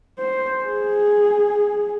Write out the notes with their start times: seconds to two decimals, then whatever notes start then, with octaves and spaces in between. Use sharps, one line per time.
0.19 C5
0.64 G#4